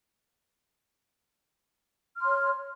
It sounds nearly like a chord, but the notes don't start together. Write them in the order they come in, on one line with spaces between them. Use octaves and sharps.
F6 C6 C#5